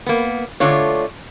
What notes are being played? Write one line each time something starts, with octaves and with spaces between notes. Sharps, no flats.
A#3 B3
D3 A3 D4 F4 C#5